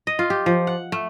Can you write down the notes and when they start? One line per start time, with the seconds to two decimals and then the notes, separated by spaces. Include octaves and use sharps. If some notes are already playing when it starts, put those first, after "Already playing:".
0.07 D#5
0.19 F4
0.30 G4
0.46 F3
0.67 F#5
0.92 A3